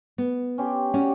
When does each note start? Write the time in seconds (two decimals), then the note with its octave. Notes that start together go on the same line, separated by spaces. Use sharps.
0.18 B3
0.58 C#4 G4 C6
0.94 C#4 F#4 G4 D5